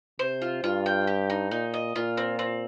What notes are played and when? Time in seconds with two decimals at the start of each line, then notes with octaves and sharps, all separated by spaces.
0.19 C3 C5
0.42 F4
0.63 G2 F4
0.86 G5
1.07 G4
1.30 D#4
1.51 A#2 D#4
1.74 D#5
1.96 A#2 F4
2.17 C4
2.39 C4